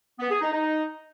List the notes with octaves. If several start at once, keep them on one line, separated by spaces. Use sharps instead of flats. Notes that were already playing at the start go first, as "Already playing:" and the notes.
B3
G#4
D#4
D#4